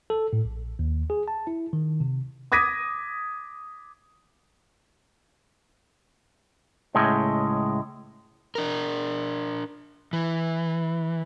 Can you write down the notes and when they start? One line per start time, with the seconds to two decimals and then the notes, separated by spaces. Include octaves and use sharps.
0.10 A4
0.33 A2
0.45 A#1
0.79 D#2
1.10 G#4
1.28 A5
1.47 E4
1.73 D#3
2.00 C3
2.52 D6 D#6 G#6 A#6 B6 D#7
6.95 C#2 A2 G#3
8.55 D4 A#4
10.13 E3